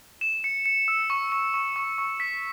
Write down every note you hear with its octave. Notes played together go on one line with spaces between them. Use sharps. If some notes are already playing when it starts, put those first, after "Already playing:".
E7
C#7
C#7
E6
C#6
C#6
C#6
C#6
C#6
B6